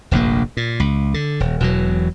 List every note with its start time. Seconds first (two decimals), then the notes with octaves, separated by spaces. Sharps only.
0.11 F1 A#1 G2 A#3
0.57 A#2
0.80 C#2
1.14 D3
1.40 D#1
1.60 E1 B2 E3 F#3